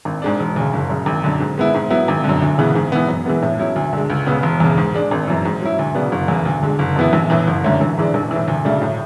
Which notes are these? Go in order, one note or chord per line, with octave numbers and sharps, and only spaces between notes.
G#1
G#2 G#3 D4
E1
D2 C#3
F#1
F#2 C#3
G#1
F#2 D3
G#2
G#3 B3 E4
G#2
F#3 B3 E4
G#1
D3
F#2
D2
C#3 E3 G#3 B3
G#2
E3 B3
F#2
E3 G#3 B3
A2
F#3 C#4 E4
D2
D3 G#3
C#2
C#3 G#3 B3
E1
E2 C#3
G#2
G#3 D4
G#1
F#2 E3
G#2
F#3 C#4 E4
D2
C#3 F#3 B3 D4
F#1
E2 C#3
D2
D3 G#3
F#1
F#2 E3 B3 E4
A1
A2 E3
F#1
F#2 D3 A3 C#4
A1
G#2 E3 G#3 D4
A1
E3
A2
D2
C#3 F#3 A3 D4
A2